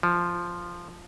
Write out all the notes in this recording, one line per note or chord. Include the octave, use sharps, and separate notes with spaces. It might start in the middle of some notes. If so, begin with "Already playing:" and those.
F3